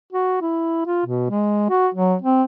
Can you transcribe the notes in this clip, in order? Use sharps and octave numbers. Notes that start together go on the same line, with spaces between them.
F#4
E4
F4
B2
G#3
F#4
F#3
C4